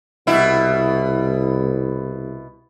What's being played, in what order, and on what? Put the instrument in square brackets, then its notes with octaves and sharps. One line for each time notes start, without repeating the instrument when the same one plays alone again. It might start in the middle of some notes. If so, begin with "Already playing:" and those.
[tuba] C2 [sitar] B2 E4